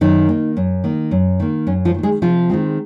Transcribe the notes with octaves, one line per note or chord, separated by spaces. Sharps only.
F#2 D#3 D#4
D#3 A#3
F#2
D#3 A#3
F#2
D#3 A#3
F#2 C#4
F3 F4
D#3 A#3
G#3 G#4
C3 F3 F4
D#3 G#3 C4